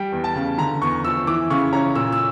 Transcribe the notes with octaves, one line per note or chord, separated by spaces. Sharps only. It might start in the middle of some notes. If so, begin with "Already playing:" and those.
Already playing: G3 G5
E2
A5
C#3
D3 A#5
E2 C#6
F3 E6
E3 D6
C#3 C#6
C#4 A#5
A#2 E6
E6